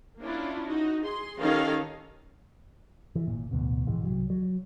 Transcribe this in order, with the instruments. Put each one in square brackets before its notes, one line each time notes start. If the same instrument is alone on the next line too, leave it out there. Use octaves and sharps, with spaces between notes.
[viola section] A#3 C#4 D4 E4 F4
D#4 F#4
G#4 C6
D#3 C#4 G4 A4 C#5 F5
[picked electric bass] E3
G#1 A#2
A1 D2 B2
A#1 G#2 E3 G#3
C2 F#3
F#3